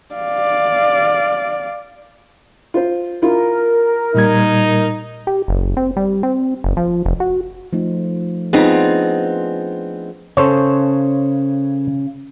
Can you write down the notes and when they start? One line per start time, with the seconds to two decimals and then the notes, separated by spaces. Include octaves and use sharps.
0.15 D5 F5
2.74 F4 C5
3.22 E4 F4 A#4
4.15 A#2 G3 D#4 G#6
5.27 G4
5.48 F#1
5.77 C4
5.97 G3
6.23 C4
6.64 F#1
6.77 F3
7.06 F1
7.20 F#4
7.73 F3 A3 D#4
8.53 B3 C4 D4 D#4 F4 G#4
10.37 C#3 A4 C5 C#5